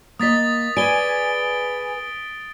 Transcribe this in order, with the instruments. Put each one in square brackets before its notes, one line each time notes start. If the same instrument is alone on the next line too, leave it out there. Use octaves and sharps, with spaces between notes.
[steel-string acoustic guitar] A#3 D#5 [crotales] D#6 A6 B6
[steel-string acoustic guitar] G#4 B4 D5 [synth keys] G#5 [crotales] D7 G7